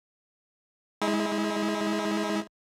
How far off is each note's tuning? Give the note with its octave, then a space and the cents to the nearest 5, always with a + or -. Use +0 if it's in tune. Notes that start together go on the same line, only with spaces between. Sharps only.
G#3 +0 E4 -35